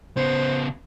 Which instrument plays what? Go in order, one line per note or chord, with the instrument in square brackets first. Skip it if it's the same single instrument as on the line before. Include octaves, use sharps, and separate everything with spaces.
[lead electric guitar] C#3 B3 [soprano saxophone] C5